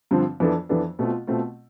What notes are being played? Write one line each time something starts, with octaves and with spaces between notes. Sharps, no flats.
G2 D3 F3 C4
F2 E3 B3 D4 A4
F2 E3 B3 D4 A4
B2 A3 C4 F4
B2 A3 C4 F4